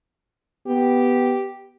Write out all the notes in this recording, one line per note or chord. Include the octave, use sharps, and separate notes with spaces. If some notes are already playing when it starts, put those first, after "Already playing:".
B3 G4